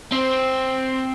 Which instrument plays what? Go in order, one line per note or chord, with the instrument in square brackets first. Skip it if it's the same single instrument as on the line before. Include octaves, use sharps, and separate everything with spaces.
[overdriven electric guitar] C4